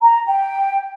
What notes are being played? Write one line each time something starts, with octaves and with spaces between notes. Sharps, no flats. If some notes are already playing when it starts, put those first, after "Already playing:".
A#5
G5